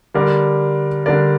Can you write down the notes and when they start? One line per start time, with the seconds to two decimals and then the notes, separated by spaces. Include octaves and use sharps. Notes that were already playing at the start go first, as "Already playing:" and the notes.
0.14 D3 G3 D4 A#4 D5
1.06 D3 G3 D4 A#4 D5